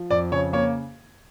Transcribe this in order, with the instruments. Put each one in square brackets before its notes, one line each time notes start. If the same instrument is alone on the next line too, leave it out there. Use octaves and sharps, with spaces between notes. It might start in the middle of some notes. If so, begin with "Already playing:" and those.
Already playing: [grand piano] F3
F2 D5
C#3 C#5
A#3 C#5